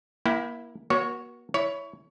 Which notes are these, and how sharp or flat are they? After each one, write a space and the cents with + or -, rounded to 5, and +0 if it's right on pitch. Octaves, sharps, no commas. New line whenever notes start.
A#3 +30 E4 +0 G5 -20
A#3 +45 F#4 +0 C#5 +0
E4 +0 C#5 +20